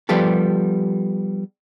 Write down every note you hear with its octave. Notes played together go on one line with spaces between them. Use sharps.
F3 G3 B3 G4 A4